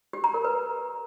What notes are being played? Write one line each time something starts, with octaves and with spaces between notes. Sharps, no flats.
G4
A#5
A#4
B4